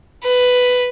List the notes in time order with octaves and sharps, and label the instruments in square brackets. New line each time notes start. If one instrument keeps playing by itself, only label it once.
[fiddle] B4